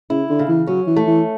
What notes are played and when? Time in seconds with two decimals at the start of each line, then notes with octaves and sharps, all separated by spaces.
0.10 C#3 E4
0.29 D3
0.39 C#3
0.48 E3
0.67 F#3 C#4
0.87 E3
0.96 A3
1.07 E3